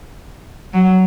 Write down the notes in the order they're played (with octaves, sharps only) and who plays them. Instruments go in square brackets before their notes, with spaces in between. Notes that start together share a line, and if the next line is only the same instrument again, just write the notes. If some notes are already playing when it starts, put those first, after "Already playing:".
[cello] F#3